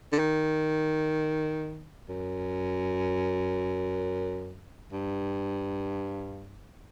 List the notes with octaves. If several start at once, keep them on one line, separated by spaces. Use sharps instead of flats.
D3
D#3
F#2
G2